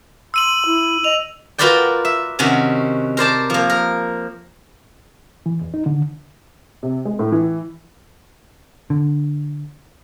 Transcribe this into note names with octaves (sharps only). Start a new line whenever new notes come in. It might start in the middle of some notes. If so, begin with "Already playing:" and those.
C6 E6 D#7 F#7
E4
D#5 F7
F4 F#4 A#4 B4 D5 G5
E5
C3 D#3 C#4 F#4
A#4 C5 D5 A5
F3 A#3
A#4
E3
E2
D#4
D3
C3
G#3
A2
E3
D3